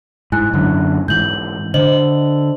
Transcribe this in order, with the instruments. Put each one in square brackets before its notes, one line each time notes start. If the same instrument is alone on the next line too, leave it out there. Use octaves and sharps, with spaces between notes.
[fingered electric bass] G#2 [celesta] E4 G#5 F#6
[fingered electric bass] F#2 D3
[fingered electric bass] G#2 E3 [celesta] G6 F#7
[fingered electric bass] D3 [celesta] C5 D#5 F#7